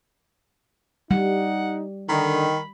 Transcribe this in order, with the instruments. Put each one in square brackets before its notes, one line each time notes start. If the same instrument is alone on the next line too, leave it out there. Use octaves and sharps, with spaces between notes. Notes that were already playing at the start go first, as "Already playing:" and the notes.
[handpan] G3 [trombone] D#4 [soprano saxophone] F#5
[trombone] D3 [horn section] D#3 [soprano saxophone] B5